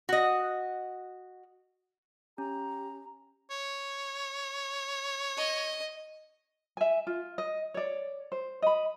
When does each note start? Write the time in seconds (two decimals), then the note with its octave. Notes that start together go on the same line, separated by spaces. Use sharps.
0.09 F#4 D#5
2.38 C#4 G4 A#5
3.51 C#5
5.37 D#5
6.77 E5 G#5
7.07 F4
7.38 D#5
7.74 C#5 D5
8.32 C5
8.62 D#5 B5